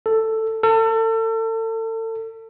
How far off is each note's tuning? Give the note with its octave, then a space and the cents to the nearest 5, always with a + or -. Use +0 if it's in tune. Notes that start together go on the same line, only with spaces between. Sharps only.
A4 +10
A4 +35